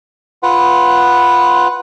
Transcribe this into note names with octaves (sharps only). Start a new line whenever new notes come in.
F4 B4 F#5